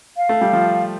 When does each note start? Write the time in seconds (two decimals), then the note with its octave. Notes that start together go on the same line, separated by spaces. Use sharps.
0.17 F5
0.29 A3
0.41 G3
0.53 F3